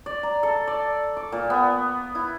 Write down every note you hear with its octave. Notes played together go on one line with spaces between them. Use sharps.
D5
A#5
A4
D5
D6
A#2
B3
E4